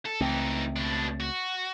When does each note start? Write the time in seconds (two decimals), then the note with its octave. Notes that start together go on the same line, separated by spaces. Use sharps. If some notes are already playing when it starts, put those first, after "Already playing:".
0.06 A4
0.21 C#2 E3 A3 C4 D#4
0.76 B2 D4
1.20 F#4